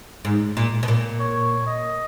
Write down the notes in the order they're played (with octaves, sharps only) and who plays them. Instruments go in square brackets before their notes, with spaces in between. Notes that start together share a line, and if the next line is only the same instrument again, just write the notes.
[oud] G#2
A#2
B2
A#2
[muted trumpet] C#5
D#5